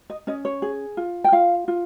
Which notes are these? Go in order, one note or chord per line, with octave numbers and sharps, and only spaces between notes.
D#5
C#4 D#5
C#5
G#4
F4
G5
F4 F5
F4